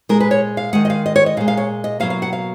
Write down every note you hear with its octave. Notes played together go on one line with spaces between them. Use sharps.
A#2 G#3 A#4
B4
C#5
F5
D#3 G#3 F#5
D#5
F5
D#5
C#5
D#5
A#2 G#3 F5
F5
C#5
D#5
B2 F#3 A#3 F5
F5
F#5
F5